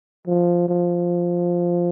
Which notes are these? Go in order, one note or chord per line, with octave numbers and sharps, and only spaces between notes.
F3
F3